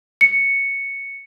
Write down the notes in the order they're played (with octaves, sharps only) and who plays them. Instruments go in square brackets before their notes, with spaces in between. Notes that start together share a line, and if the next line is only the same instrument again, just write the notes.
[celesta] C#7